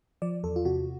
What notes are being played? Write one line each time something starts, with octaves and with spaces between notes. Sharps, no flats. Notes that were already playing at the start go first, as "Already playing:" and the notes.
F3 D5
E2 A4
F4
C3 F#4